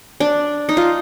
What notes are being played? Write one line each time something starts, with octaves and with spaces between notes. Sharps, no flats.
D4
D#4
F4